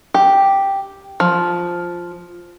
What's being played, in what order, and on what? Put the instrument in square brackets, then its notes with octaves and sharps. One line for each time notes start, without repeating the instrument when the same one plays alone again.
[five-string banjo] G4
F3